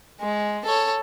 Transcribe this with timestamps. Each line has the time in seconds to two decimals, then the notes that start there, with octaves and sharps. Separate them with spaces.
0.21 G#3
0.65 A4 C#5